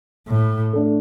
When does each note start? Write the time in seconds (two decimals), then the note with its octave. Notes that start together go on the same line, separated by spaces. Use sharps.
0.28 A2
0.73 A3 D4 A4